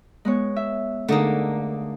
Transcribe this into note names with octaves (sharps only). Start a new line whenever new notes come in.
G#3 B3 C#5
E5
D3 A3 A#3 D#4 G#4